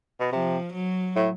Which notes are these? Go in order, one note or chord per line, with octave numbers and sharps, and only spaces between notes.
B2
C3 F3
F#3
A2